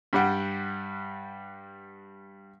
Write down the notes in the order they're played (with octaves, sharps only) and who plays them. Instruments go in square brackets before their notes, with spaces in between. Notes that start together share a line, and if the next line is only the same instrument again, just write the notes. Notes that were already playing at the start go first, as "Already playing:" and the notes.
[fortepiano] G2 G3 F#5 G5